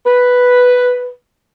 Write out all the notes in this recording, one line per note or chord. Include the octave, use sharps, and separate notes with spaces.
B4